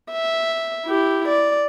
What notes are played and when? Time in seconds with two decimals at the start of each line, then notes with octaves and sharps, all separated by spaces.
0.12 E5
0.86 E4 G4
1.28 D5